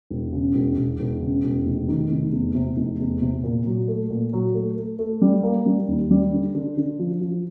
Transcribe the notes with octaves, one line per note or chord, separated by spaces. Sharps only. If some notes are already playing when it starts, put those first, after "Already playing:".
E1
C#3
E1
E1
E1
C#3
E1
F1
D#3
F1
E2
C3
F1
E2
C3
A#2
F#3
A3
A#2
F#3
A3
A3
A3
G3
A#3
G3
D#2
G3
D3
D3
D3
F3
F3